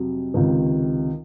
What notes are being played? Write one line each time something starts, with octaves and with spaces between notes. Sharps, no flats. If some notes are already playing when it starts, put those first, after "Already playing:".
Already playing: F2 C3 F#3
C#2 C3 D#3